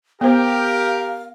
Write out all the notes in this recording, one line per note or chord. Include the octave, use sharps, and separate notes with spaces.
B3 G4 A#4 C5 F5